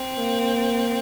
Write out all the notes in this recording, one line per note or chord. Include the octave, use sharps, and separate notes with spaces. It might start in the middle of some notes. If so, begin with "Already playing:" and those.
Already playing: C4
A#3